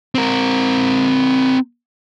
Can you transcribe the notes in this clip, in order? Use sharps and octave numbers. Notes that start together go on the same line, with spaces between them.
C4 A#4